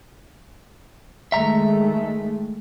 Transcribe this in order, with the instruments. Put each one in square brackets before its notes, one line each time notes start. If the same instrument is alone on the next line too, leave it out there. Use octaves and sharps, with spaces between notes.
[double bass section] D#3 G#3 A3 [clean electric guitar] E5 A#5